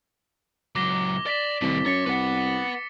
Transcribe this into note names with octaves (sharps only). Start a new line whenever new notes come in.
C#2 F#3 D6 A#6 G7
D5 A6 B6 E7
C2 A2 D#3
F#2 C#5 A6 C#7
C2 B4 F#5